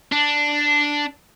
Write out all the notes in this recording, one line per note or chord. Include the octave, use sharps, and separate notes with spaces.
D4